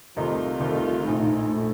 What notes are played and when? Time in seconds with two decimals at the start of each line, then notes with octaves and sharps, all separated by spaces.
0.17 C2 C3 D#3 A3 D#4 F4
0.60 C2 C3 D#3 A3 D#4
1.03 A#1 A2 A3 D#4
1.47 A#1 A2 A3